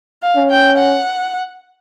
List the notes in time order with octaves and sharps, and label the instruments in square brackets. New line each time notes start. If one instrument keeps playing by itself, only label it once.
[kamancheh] F5
[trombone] C#4
[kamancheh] G5
F#5